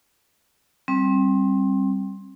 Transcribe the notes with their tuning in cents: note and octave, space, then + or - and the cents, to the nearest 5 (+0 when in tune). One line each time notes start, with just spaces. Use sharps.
G3 +0 C4 +25